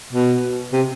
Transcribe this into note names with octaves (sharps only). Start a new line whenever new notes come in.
B2
C3